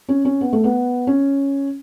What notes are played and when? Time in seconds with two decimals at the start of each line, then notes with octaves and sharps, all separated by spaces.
0.09 C#4
0.25 C#4
0.41 B3
0.53 A3
0.64 B3
1.07 C#4